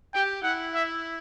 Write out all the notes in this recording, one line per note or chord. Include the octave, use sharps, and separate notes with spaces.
G4 G5
E4 F#5
E5